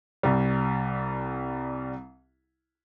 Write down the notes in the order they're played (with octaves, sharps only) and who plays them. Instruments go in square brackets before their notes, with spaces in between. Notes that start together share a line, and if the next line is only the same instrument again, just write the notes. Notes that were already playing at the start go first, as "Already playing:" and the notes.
[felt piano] C2 G3